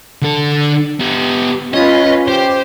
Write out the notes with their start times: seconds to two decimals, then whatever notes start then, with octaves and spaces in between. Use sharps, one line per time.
0.22 D3 A4
1.00 B3 G4
1.74 C#4 F4 B4 D#5
2.28 G4 C5